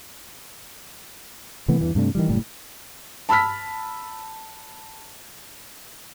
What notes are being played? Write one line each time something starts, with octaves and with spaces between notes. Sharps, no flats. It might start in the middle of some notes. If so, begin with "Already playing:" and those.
C3 E3 A3 B3
E2 G2 E3
G2 C3 A3 D4
D#3 E3 G3
F#1 A2 G3
A5 B5 E6 F6 B6